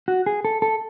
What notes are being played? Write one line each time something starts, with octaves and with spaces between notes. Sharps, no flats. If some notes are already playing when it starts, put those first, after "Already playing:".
F#4
G#4
A4
A4